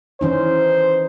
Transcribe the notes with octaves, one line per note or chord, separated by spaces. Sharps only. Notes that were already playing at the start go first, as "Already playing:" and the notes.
E3 C#4 D#4 C5